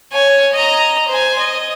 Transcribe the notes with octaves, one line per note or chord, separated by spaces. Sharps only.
C#5 G#5
D#5 A#5
C5 G#5
D#5